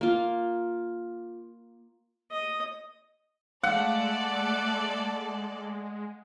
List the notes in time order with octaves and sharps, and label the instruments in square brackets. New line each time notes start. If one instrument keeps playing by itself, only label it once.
[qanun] A#3 F4
[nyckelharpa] D#5
[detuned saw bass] G#3 [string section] A3 A4 D5 [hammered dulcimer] F#5